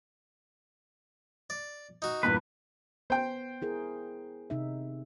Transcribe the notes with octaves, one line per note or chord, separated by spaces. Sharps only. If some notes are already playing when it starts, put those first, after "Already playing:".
D5
D#4 F#4
E2 G2 A#2 B4
B3 C5 G5
E4 G#4 A#4
C3 D#4 E5